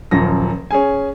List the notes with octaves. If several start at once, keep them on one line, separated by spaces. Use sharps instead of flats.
D#1 F#2 F3 A#6
C#4 G#4 G#5